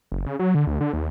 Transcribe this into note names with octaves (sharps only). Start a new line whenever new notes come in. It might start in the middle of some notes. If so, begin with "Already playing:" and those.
F#1
C#3
F#3
D3
D2
D3
D#2